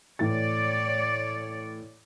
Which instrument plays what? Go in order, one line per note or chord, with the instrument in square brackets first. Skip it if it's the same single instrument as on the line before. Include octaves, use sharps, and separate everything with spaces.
[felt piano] A2 E3 A6 [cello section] C#5 D5